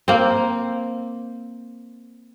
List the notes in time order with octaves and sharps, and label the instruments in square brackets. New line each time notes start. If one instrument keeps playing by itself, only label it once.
[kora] A#3 C4